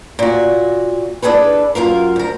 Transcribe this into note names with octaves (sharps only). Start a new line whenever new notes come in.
A#2 F#4
D4 D#4 G#4 A4 B4
F#2 F4 A#4 F5
D2 A#4